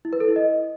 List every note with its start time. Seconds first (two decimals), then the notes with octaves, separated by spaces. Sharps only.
0.05 E4
0.13 B4
0.20 A4
0.28 E4
0.36 D#5